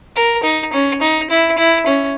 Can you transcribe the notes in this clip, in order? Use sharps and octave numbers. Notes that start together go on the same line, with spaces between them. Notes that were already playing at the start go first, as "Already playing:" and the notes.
A#4
D#4
C#4
D#4
E4
E4
C#4